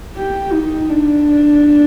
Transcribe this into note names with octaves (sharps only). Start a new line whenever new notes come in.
G4
D#4
D4